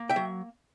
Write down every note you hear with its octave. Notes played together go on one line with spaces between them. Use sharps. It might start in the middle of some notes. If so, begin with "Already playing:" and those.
Already playing: A#3
E5 G5
F#3